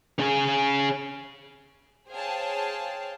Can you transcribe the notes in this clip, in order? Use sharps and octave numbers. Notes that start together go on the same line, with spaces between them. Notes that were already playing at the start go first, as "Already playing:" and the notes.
C#4 G#4
G#4 C5 C#5 F5 G5 A5